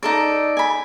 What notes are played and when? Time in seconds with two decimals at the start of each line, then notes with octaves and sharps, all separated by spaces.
0.03 D#4 A4 D5
0.57 G#5 B5